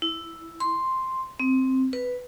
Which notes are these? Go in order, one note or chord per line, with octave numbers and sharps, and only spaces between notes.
E4
C6
C4
B4